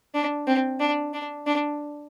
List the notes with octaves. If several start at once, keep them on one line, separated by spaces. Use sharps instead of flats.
D4
C4
D4
D4
D4